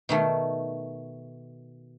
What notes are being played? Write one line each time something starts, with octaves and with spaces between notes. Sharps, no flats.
B2 D#3 A3